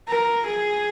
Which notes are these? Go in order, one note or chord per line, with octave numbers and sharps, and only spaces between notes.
A#4
G#4